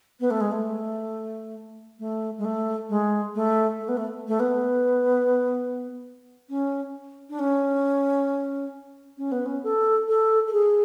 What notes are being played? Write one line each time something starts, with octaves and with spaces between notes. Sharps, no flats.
B3
A3
G#3
A3
A3
G#3
A3
G#3
A3
A3
B3
A3
A3
B3
C#4
D4
C#4
C#4
B3
C#4
A4
A4
A4
G#4